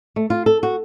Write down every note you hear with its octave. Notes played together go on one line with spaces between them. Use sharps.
A3
F4
A4
F#4